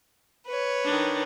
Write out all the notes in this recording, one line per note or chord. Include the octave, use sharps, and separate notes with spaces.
B4 C#5
D#3 D4